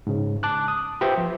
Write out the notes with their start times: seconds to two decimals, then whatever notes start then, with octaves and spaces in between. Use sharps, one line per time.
0.07 G#2 C#3
0.43 A5 D6 F#6
0.68 D#6
1.01 F4 G4 B4 C5 E5 G5
1.18 F3